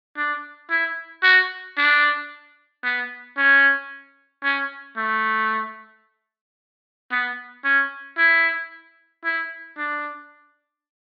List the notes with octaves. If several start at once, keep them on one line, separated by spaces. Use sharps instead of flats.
D4
E4
F#4
D4
B3
C#4
C#4
A3
B3
C#4
E4
E4
D4